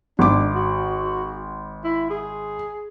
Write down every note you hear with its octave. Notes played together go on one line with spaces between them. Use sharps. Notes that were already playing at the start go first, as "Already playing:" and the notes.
G#1 D4 D6
F#4
E4
G#4